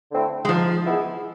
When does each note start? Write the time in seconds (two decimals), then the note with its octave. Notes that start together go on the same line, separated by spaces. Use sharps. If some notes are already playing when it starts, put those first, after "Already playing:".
0.11 D3 A3 C4 E4
0.45 G#3
0.49 G#2 F3
0.85 E3 G#3 B3 E4